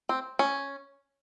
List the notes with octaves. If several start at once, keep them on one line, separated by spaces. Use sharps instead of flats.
C4
C#4